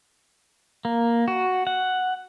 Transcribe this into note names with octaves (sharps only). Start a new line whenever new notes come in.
A#3
F#4
F#5